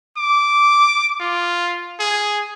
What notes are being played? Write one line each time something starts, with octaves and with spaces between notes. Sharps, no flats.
D6
F4
G#4